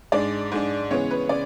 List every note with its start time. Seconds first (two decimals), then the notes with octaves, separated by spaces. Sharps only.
0.12 G#2 G#3 D4 D5
0.52 G#2 G#3 D4
0.91 C#3 E3 G#3 B3 C#5
1.11 B4
1.29 C#3 D5